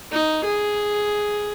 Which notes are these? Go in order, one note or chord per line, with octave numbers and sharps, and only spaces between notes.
D#4
G#4